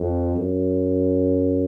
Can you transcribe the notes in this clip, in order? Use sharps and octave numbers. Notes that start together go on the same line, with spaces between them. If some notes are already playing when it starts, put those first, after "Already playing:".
Already playing: F2
F#2